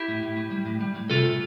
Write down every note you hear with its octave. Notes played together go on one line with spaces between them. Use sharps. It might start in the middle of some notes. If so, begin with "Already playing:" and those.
Already playing: E4 G4
A2
A2
A2
G3
A2
G3
A2
C3 F4 A4